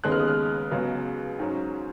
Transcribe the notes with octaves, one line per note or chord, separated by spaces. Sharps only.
D#2 C#3 G#3 B3 F#6
F6
D#6
F6
C#2 C#3 F#3 B3
G#2 F#3 C#4